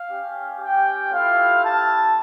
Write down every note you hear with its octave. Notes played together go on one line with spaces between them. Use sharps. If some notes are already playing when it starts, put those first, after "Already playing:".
Already playing: F5
C#4 G4
G4 G5
A3 E4 F4 G4 F5
A4 A5